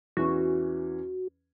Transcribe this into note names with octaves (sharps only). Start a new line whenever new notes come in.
E2 E3 C#4 F#4